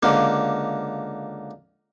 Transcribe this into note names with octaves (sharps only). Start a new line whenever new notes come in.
C#2 D3 A#3